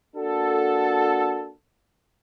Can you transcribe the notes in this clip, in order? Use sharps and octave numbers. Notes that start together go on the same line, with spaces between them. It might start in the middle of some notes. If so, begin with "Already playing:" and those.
A#3 D4 F#4 A4